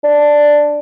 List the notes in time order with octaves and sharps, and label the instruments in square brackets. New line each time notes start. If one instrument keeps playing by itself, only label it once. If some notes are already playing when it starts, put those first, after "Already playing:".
[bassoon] D4